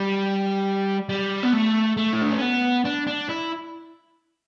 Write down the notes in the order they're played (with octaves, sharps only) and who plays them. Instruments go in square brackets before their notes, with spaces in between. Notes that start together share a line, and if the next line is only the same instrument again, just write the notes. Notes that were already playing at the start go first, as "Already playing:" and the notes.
Already playing: [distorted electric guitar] G3
G3
B3
A3
A3
E4
D4
C#4
B3
D4
D4
E4